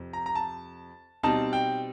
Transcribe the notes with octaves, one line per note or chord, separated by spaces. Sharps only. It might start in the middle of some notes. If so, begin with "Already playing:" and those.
Already playing: F2 C3
A#5
A#5
A5
B2 G3 C4 D#4 A5
G5